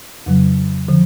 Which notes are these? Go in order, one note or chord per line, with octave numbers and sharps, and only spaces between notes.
F2 C#3 F#3
D3 F3